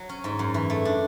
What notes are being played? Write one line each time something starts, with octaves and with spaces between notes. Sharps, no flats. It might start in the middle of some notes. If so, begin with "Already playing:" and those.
Already playing: F#3
C#4
G#2
F#2
E3
A3
D4